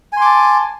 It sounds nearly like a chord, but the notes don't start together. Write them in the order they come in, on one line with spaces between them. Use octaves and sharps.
G#5 C6 D6 A5